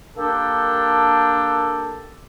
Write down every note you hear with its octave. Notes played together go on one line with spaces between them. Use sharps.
A#3 D4 G4 A4